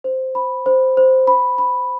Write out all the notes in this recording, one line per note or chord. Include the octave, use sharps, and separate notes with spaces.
C5
B5
C5
C5
B5
B5